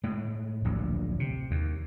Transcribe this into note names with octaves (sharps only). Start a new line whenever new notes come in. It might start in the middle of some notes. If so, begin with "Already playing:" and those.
A2 G#3
D1 A#1
C3
D#2